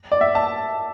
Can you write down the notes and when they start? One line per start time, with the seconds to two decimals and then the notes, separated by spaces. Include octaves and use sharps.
0.12 D5
0.21 E5
0.35 A5